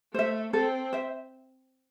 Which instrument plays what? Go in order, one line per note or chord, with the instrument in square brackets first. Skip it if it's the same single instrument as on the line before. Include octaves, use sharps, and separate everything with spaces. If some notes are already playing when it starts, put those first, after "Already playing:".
[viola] A3 [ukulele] C5 E5
[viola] C4 [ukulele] A4
[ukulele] C5 E5